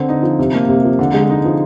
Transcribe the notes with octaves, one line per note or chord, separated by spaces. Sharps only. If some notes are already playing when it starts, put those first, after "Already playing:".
Already playing: D3 C4
D#4
F3
C3
A#3
C3
F3
D3
G#3
D#4
F3